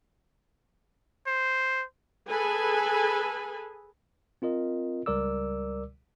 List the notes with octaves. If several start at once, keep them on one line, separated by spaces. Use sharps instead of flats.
C5
G#4 A4 B4 G#5
C4 F4 A#4 D#5
C#2 G3 A#4 D5 D6 E6